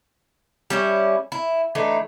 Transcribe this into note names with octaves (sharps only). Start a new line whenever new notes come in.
G3 C#4 E4
E4
E3 A3 D4 D#4